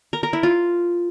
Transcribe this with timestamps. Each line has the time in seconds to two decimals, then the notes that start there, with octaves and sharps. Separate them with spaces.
0.13 A#4
0.23 A#4
0.33 E4
0.43 F4